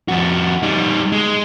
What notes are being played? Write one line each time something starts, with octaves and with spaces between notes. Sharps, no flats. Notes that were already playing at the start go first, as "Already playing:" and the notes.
F2 F#4
G3 D#4
G#3